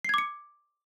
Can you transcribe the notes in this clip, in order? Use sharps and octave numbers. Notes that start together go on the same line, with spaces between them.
D6 G#6 C7 C#7